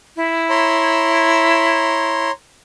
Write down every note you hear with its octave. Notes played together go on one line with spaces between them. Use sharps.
E4
C#5 A#5 C6